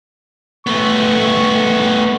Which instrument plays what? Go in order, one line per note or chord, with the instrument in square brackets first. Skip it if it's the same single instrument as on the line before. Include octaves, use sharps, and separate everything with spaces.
[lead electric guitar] A3 B3 [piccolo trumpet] C#6